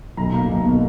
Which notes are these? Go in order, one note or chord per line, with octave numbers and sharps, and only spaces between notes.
B1 A#5
B2 A#3
B1
B2 A#3